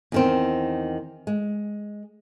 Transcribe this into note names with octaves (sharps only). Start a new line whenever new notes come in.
E2 D#3 C4
G#3